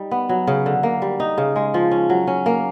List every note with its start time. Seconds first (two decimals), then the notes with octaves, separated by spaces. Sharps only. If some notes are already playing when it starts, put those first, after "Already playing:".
Already playing: G3 D#4
0.11 B3
0.29 F#3
0.47 C#3
0.66 D3
0.83 A#3
1.02 G3
1.20 D#4
1.38 C#3
1.56 G#3
1.74 F3
1.91 C#4
2.10 F#3
2.27 C#4
2.46 A#3